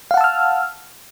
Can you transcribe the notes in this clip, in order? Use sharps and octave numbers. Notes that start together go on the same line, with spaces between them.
F5 F#5 A5 E6 F6